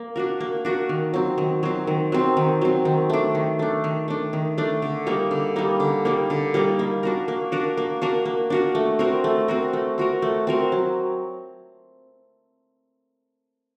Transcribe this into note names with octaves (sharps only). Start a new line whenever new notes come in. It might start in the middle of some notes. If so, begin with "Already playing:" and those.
Already playing: A#3
D4 F#4 A#4
A#3
D4 F#4 A#4
D#3
F#3 C4
D#3
F#3 C4
D#3
F#3 C4
D#3
F#3 C4
D#3
A3 D4
D#3
A3 D4
D#3
A3 D4
D#3
A3 D4
D3
G3 A#3 D#4
D3
G3 A#3 D#4
D3
G3 A#3 D#4
D3
G3 A#3 D#4
A#3
D4 F#4 A#4
A#3
D4 F#4 A#4
A#3
D4 F#4 A#4
A#3
D4 F#4 A#4
A3
C4 F#4 A#4
A3
C4 F#4 A#4
A3
C4 F#4 A#4
A3
C4 F#4 A#4
F#3